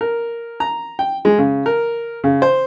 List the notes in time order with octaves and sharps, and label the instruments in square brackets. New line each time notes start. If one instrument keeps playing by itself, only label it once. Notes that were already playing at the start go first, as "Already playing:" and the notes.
[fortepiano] A#4
A#5
G5
G#3
C#3
A#4
C#3
C5